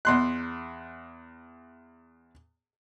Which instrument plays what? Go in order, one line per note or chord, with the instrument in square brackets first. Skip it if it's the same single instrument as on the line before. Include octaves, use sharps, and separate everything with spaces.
[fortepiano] E2 C6 F#6